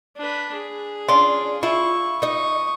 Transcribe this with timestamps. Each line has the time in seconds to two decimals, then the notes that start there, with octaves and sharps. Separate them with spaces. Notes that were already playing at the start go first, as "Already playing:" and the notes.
0.17 D4 B4
0.54 G#4
1.08 C#4 D4 F4
1.63 E4 F4 C#6
2.22 D#4 D#5 C#6 D#6